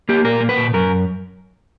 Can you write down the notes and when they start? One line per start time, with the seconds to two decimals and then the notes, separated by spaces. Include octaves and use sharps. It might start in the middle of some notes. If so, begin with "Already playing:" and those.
0.09 A#3 G4
0.24 A#2 A#4
0.41 A#3
0.49 B4
0.57 A#2
0.74 F#2 A#4